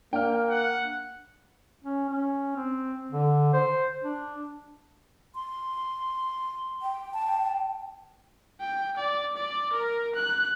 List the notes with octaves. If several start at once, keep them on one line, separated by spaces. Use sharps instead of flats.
A#3 D4 G5 F6
F#5
C#4
C#4
C4
D3
C5
D4
C6
G5
A5
G5
D5
D5
A#4
F#6